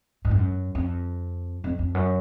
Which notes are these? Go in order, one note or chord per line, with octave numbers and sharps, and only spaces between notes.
G#2
F#2
F2
F2
F2
F#2